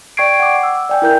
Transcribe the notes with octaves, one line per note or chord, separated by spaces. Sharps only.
D5 G5 C#6 G#6 C7 D7
F#5 D6
E6
D5 G5 G#5
E4 A#4 G6